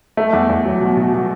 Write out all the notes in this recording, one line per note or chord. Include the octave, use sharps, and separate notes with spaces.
A3
E2
E2
F#3
B2
B2
B2